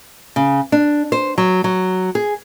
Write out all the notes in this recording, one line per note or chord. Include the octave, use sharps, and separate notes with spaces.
C#3
D4
C5
F#3
F#3
G#4